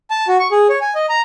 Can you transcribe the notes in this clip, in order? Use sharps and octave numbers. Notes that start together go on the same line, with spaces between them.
A5
F#4
C#6
G#4
C#5
G#5
D#5
A#5